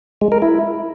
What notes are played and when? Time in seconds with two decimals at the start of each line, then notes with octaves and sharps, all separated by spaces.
0.21 G#3
0.32 A#4
0.42 E4